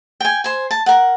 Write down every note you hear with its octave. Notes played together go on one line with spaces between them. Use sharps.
G5 G#5
C5 G#5
A5
A#4 F#5